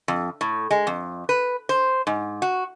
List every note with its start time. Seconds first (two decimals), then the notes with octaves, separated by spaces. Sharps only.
0.08 F2
0.41 A2
0.71 G#3
0.87 F2
1.29 B4
1.69 C5
2.07 G#2
2.42 F#4